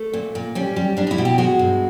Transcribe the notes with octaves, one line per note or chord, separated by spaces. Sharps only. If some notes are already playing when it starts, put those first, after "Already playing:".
Already playing: A3
A#2
A#2
G3 C#4
G3
G3 D4
D#4
E4
B2
G4
G#3 F#4
G2